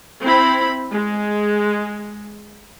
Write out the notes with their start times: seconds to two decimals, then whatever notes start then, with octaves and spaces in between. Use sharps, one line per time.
0.24 C4 E4 B5
0.91 G#3